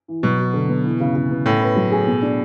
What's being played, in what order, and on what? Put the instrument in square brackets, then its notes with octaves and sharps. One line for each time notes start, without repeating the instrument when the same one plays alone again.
[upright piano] E3
[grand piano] B2 [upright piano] F#3
[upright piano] F#4
D3
B3
E3
C#3
C#3
B3
[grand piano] A2 [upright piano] C#4
[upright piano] B4
F#3
G#4
B2
D4